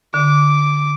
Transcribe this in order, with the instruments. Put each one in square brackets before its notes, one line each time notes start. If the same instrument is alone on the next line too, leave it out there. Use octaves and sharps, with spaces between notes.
[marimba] D3 [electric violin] D6